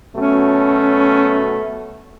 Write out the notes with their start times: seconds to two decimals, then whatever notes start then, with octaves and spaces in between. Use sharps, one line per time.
0.16 B2 F#3 A3 C#4